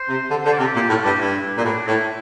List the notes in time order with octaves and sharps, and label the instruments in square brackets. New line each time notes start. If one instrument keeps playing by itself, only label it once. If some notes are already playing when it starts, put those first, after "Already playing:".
Already playing: [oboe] C5
[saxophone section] C3
D3
[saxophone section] D3 [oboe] C5
[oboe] D5
[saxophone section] C3 [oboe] F4
[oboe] G4
[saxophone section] A#2 [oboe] G4
[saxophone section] A2 [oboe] F4
[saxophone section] G2 [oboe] G4
[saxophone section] G2 [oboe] E4
[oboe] E4
[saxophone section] A#2
[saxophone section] A2 [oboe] D4
[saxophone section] A2 [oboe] E4